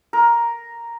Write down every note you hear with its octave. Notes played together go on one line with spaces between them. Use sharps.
A#4